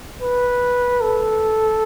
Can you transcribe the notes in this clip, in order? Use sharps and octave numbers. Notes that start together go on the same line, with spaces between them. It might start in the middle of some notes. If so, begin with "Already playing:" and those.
B4
A4